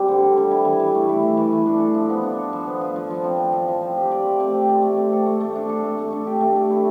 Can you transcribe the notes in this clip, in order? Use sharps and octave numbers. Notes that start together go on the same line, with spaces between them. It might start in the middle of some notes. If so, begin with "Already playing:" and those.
Already playing: G3 C4
D3
D3
G3
E4
E3
E3
A3
E4
E3
E3
A3
D4
A4
F3
B3
D4
A4
F3
B3
F4
F3
F3
C4
F4
F3
F3
C4
G4
D5
A3
C4
G4
D5
A3
C4
A4
A3
A3
D4
A4
A3
A3
D4
G4
A3
A3
E4